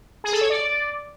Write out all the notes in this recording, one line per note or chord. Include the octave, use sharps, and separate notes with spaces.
G#4
A4
C#5
D5